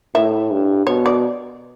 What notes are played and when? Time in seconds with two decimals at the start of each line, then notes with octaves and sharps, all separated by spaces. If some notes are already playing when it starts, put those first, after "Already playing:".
0.15 A2 E5
0.51 G2
0.86 B2 C#5
1.06 D5